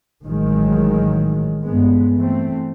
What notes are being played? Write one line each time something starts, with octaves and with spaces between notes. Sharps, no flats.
A1 A2 D#3 F#3 G#3
G2 G#3 B3
E3 A3 C4